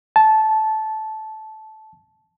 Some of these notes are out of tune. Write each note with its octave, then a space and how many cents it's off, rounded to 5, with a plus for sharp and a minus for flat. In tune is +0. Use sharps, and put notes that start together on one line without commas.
A5 -15